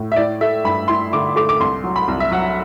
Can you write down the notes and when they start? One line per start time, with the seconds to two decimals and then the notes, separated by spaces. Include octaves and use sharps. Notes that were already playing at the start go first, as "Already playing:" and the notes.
Already playing: A2
0.12 E5
0.16 E4 D5
0.41 A3 E5
0.64 G2 B5
0.88 E4 C6
1.13 D3 D6
1.36 A3 D6
1.49 D6
1.60 C2 C6
1.84 F#3
1.96 B5
2.08 C2
2.20 E5
2.31 F#3 F#5